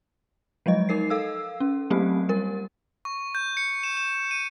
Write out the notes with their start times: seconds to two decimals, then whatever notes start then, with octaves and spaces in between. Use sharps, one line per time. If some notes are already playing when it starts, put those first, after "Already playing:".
0.66 F3 F#3 G#3 D#5
0.89 D#4 A#4 C7
1.10 A4 F5 E6
1.60 C#4
1.90 F#3 A3 A#3 C4 G4
2.29 G3 A#4
3.05 C#6
3.35 G6
3.57 C#7
3.83 E7
3.97 E7
4.31 D#7